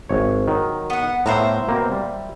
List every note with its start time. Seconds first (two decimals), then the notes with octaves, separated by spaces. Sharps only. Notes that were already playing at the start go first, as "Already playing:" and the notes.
0.09 G#1 C#5
0.48 D#3 F#3
0.90 B3 F#5
1.26 A2 B3 C5 E5 F5 A#5
1.68 B2 A#3 C4
1.92 G3